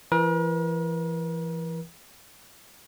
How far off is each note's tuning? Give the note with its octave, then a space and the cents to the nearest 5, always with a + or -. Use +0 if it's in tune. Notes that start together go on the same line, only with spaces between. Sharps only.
E3 +30 A#4 +45